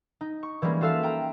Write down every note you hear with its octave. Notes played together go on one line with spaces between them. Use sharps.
D#4
C#6
E3 G3 G#3 A#3 C#4
F4 F#4 A4 E5 F5
G5 A#5